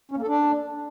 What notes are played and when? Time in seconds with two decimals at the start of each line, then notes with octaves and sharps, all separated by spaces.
0.12 C#4
0.17 A#3
0.22 A4
0.28 D4